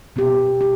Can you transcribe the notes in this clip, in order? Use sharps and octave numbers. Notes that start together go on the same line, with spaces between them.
B2 B3 G4
G4